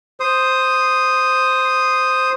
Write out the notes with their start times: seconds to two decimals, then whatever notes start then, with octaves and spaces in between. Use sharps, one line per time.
0.20 C5 D#6